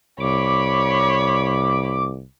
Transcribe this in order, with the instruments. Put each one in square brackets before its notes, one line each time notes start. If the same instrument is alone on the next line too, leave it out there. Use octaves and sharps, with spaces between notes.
[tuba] C2 [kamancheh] C#5 B5 [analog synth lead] D6